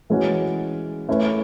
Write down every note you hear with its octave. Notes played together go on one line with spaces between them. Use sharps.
E3 G#3 C#4 F#4
A3 C#4 E4 B4